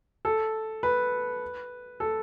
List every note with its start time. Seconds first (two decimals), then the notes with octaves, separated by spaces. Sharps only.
0.25 A4
0.83 B4
2.00 A4